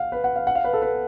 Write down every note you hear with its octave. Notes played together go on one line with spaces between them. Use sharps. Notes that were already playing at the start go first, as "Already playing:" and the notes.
Already playing: F5 F#5
B4
F#5
F5
F#5
F5
B4
A4
B4